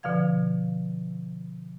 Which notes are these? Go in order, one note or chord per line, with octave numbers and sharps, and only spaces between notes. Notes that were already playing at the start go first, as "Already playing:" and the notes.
B2 D3 F3 F5 G#6